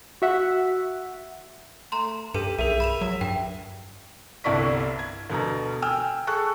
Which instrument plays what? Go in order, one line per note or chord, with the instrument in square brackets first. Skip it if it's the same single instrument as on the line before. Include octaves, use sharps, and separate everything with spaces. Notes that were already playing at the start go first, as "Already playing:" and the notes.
[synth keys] F#4 E5 F#5
[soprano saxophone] A3 [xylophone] A#5 C6
[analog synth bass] G2 [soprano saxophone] G4 [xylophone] A4 B4 D#7
[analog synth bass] B1 [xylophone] G#4 A#4 [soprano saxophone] E5
[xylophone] B5 E7 F7
[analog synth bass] F#3
[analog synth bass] G2 [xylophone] G5
[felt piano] G1 C2 E4 D5 C#6 B6
G#6
D2 B2 A#5
G5 G#5 E6 F6
G#4 A4 A5 C#6 F#6